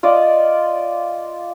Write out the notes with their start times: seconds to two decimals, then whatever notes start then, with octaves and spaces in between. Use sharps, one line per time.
0.03 F4 D5 D#5